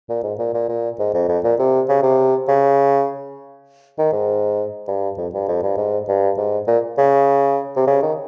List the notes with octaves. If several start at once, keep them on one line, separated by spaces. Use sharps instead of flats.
A#2
G#2
A#2
A#2
A#2
G#2
F2
F2
A#2
C3
C#3
C3
C#3
D#3
G#2
G2
F2
G2
F2
G2
G#2
G2
G#2
A#2
C#3
C3
C#3
D#3